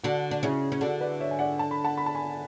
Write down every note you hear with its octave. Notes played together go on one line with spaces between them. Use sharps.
D3 D4 F#4
D4
C#3 C#4 E4 G#4
C#4
D3 D4 F#4 A4
B4 D5
C#5 E5
G#5
D5 F#5
A5
B5
F#5 A5
B5
A5
G#5 B5